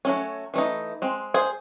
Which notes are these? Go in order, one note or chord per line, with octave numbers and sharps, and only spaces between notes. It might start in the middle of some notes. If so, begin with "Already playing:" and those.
F#3 A3 C#4
E3 A3 D#4
G#3 C4
G#4 C5